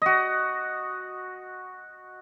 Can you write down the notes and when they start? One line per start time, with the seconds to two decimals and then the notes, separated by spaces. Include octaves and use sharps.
0.02 F#4 D#5